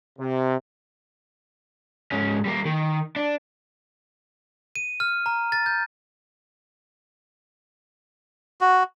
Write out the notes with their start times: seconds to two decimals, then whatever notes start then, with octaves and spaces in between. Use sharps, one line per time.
0.19 C3
2.12 G#2 C#4
2.45 G3 A#3
2.65 D#3
3.16 D4
4.76 D#7
5.00 F6
5.26 A#5
5.52 A6
5.66 G6
8.61 F#4